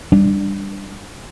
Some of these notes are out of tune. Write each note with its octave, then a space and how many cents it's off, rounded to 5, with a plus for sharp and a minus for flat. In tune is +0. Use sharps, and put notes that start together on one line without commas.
G3 +15 D4 +0